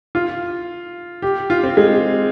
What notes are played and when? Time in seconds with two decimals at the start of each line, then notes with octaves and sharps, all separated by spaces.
0.15 F4
1.22 G4
1.50 F4
1.63 C4
1.77 G#3